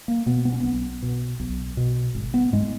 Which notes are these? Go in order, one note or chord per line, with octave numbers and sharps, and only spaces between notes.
A#3
B2 B3
B3
C#4
B1 B3
B2
B1
B2
G#1
B3
G#2 G#3